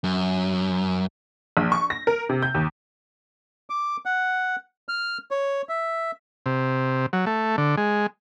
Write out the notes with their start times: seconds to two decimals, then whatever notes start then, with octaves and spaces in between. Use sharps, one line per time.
0.04 F#2
1.57 A#1
1.72 C#6
1.90 A#6
2.07 A#4
2.29 C3
2.42 G6
2.54 D#2
3.70 D6
4.05 F#5
4.89 F6
5.31 C#5
5.69 E5
6.46 C3
7.13 F#3
7.26 A3
7.58 D3
7.77 G#3